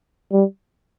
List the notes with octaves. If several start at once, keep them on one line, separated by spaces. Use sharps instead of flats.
G3